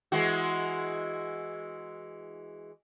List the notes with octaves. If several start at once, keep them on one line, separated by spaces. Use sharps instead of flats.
E3 G#3 F#4